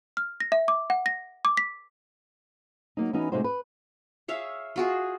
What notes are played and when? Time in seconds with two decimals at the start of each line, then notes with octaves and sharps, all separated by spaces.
0.17 F6
0.40 A#6
0.52 E5
0.68 D6
0.90 F#5
1.06 A#6
1.45 D6
1.57 B6
2.97 F#3 A#3 D#4
3.13 E3 B3 C#4 D#4 F#4
3.32 C3 G#3 A3 D#4 F#4 C5
3.44 B4
4.28 G#4 C#5 E5 F5
4.76 F4 F#4 G#4